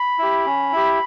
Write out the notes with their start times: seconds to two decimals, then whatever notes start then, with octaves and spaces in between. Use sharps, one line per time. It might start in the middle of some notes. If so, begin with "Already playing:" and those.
Already playing: B5
0.19 E4 G4
0.46 C#4
0.73 E4 G4